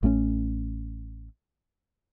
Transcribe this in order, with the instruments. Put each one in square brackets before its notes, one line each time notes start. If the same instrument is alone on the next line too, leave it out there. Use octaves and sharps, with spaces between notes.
[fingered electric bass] A1 A3 C4 C#4